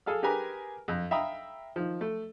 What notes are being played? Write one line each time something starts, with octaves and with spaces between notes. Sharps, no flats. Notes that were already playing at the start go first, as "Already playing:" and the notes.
G#4 A4 F5 F6
G4 G#4 A#4 B4 G#5 A#5
F2
E5 F5 G5 A#5 B5 D#6
D#3 F3
A3